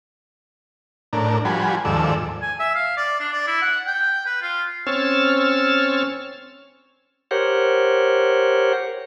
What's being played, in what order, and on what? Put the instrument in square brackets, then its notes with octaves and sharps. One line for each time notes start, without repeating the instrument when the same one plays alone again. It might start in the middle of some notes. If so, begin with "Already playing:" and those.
[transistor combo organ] A2 D4 A#4
F3 G3 F#4 G#5 B5
D#2 G#2 F3 A4 D5 E6
[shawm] G#5
E5
F5
D5
D4
D5
E4
F#5
G5
B4
F4
[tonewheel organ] C4 C#4 C#5 E6 F6 A6
G4 A#4 C5 C#5 F#5